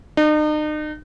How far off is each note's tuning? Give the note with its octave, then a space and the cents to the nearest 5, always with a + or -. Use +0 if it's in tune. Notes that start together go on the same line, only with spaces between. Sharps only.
D#4 -40